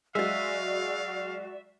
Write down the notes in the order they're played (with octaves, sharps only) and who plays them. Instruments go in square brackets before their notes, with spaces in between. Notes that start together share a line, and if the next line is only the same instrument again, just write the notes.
[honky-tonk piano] F#3 G#3 [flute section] F#4 D5 [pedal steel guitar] E5 [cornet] F5